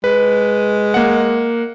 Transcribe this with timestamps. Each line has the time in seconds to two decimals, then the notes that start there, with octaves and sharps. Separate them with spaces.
0.04 G#3 B4
0.94 A#3 F#5